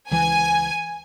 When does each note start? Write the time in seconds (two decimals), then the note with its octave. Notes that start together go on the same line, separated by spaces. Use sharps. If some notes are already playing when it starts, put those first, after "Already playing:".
0.11 C#2 E3 G#5